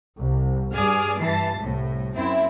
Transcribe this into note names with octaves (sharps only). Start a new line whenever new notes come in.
C2
G2 G#4 D5 G#5 F6
G2 E3 A5 C7
C2 A2
F#2 C4 E4